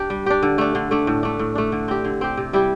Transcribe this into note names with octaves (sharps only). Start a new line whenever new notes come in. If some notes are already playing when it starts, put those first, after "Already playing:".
Already playing: D4 G4
G3
D4 G4
D3
A3 D4
D3
A3 D4
A2
A3 D4
A2
A3 D4
D3
C4 G4
D3
C4 G4
C3
G3 E4 G4